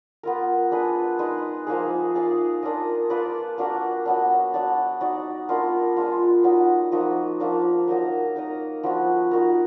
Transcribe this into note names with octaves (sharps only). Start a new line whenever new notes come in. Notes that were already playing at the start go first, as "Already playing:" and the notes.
B3 F4 A#4
D4 G#4 B4
G#3 D#4 G#4 B4
F3 A#3 D#4 G#4
D#4 G#4 D5 F5
D4 F4 A#4 D#5
A#3 F4 B4 D5
A#3 D4 F#4 A#4
F#3 B3 D4
F#3 D4 F#4 D5
D#4 F#4 D5
B3 D4 F4 A#4
G#3 D4 F4
F#3 B3 D#4
F3 A#3 D#4 F#4
F3 A#3 D4
F#3 A#3 D#4 A#4
D#4 A#4 D#5
F3 B3 D4 F#4
D#4 F#4 A#4